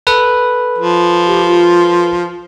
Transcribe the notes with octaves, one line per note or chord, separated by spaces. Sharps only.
A4 B4
F3
G4
F4